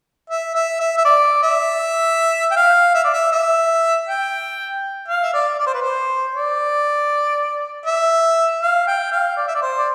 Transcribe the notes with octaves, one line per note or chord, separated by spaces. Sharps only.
E5
E5
E5
E5
D5
E5
G5
F5
E5
D5
E5
E5
G5
F5
E5
D5
D5
C5
B4
C5
D5
E5
F5
G5
F5
D5
E5
D5
C5
D5